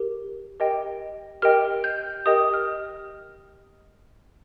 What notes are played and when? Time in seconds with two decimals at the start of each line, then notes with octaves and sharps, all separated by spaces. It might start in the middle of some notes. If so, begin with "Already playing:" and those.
Already playing: G4 A#4
0.60 G4 A#4 D#5 G5
1.42 G4 A#4 D#5 G5 F6
1.84 G6
2.26 G4 A#4 D#5 G5 D#6
2.54 F6